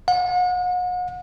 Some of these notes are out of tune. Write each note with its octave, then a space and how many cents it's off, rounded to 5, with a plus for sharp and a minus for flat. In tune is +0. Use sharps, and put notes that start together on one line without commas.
F#5 -40